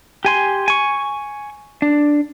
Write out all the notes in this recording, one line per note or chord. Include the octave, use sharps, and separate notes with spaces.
G4 G#5 C6
G#5 C#6
D4